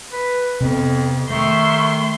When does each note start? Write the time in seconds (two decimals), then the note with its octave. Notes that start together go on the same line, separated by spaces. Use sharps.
0.13 B4
0.60 F2 C3 B3
1.30 D#3 A3 E5 C6 C#6 G6